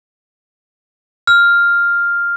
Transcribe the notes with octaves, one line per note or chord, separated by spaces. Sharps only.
F6